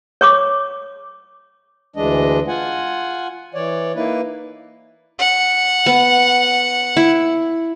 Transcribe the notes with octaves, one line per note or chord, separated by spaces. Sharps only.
C#5 C#6 D6
D2 E3 G#3 D4 D#5
F4 F#5 G#5
E3 C#5 D5
A#3 D#4 E4 B4
F#5
B3
E4